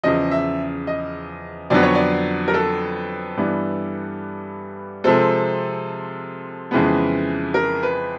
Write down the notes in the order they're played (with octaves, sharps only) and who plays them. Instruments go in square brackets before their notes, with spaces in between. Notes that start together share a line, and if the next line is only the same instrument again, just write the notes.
[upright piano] E2 C#3 F3 D#5
E5
D#5
F2 D3 F#3 B3 D5
C#5
D5
A#4
A4
G2 E3 G3 B3
C3 F3 G#3 C4 A4
F2 C#3 E3 G#3 B3
A#4
B4